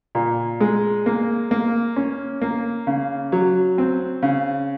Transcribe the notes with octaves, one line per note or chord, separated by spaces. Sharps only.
A#2
G#3
A#3
A#3
C#4
A#3
C#3
F#3
C4
C#3